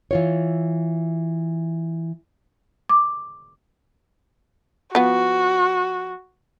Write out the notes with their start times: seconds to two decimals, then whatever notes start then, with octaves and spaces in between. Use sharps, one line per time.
0.11 E3 F4 C#5
2.89 D6
4.95 F3 B3 F#4